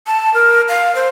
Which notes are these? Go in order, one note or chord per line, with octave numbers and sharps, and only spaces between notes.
A5
A#4
F5
C5